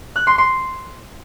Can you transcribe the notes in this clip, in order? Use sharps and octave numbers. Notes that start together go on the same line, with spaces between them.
F#6
C6
C6